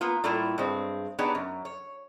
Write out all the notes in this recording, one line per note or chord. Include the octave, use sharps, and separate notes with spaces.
A#3 B3 F4
A2 G3 A3 A#3 E4 F4
G2 G#3 C4
B3 D4 D#4 G4 G#4 C#5
F#2
C#5